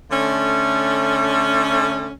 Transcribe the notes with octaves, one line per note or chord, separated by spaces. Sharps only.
D3 A3 C#4